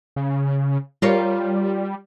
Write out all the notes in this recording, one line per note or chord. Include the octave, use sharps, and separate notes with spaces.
C#3
G3 F4 A#4 C#5